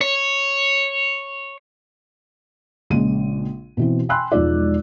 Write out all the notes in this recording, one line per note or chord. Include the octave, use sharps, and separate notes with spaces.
C#5
A#1 C#3 G#3 D#7
B2 E3 C4
G5 G#5 B5 C6 E6 F#6
E1 F3 G#3 D#4 F4 D5